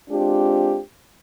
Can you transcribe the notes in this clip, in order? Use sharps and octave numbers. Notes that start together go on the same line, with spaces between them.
G#3 C4 D4 F4 G4